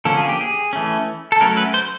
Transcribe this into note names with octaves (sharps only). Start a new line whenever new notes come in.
D3 F3 A#3 C#4 A4
G#4
G4
G#4
E3 A3 C#4
A4
F#3 A3 C#4 A#4
B4
C5